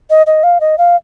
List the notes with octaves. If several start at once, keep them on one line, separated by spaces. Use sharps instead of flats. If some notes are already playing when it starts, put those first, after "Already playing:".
D#5
D#5
F5
D#5
F5